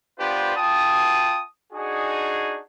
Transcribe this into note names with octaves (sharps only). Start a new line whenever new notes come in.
B3 D4 F4 G4 B4 C5
F4 G5 A5 D#6
D4 D#4 F#4 G#4